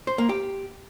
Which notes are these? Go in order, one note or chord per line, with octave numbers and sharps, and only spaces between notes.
C5
A#3
G4